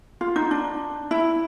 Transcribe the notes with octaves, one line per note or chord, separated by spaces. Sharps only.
F4
D#4
D4
E4